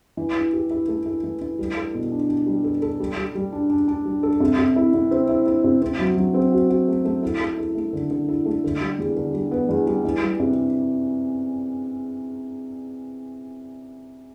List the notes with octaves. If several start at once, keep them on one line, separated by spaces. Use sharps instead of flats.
E3
E4
G4
E4
A3
E4
E3
E3
G3
A4
B2
D4
D4
G3
A4
A4
G3
G3
G3
D4
D4
D4
G3
A4
C3
C3
E4
C3
C4
E4
E4
C3
C4
F#3
F#3
C4
F#4
F#4
A3
A3
E4
A4
E4
A3
D3
D3
E4
A3
D3
G3
E2
D3
G3
B3
E2
G3
E3
G3
C3